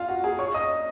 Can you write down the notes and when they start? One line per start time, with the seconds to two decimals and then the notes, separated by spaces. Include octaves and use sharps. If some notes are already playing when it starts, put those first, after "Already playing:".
Already playing: F4 F5
0.08 F#4 F#5
0.24 G#4 G#5
0.39 C#5 C#6
0.54 D#5 D#6